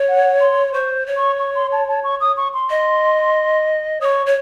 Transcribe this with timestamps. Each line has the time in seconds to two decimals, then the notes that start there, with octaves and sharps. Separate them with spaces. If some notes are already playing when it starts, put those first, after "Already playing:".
Already playing: C#5
0.09 F#5
0.40 C6
0.73 C5 C#6
1.06 C#5
1.17 C#6
1.39 C#6
1.55 C6
1.73 A5
1.88 A5
2.04 C#6
2.21 D#6
2.37 C#6
2.54 C6
2.70 D#5
4.01 C#5 D#6
4.05 C#6
4.26 C#5